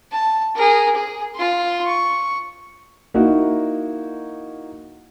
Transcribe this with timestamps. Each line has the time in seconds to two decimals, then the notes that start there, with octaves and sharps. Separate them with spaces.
0.12 A5
0.55 G#4 A#4
0.95 G#4
1.35 F4 C6
1.86 C#6
3.14 A#3 D#4 E4 F#4